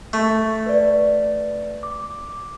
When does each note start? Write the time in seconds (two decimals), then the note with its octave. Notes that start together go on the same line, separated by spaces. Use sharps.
0.13 A3 C#6
0.66 B4 D5
1.83 D6